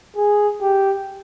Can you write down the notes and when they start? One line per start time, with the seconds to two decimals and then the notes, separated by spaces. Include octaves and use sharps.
0.17 G#4
0.62 G4